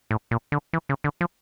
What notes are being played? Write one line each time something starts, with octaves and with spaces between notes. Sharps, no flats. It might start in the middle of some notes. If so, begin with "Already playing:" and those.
A2
A#2
D3
E3
C#3
D3
F3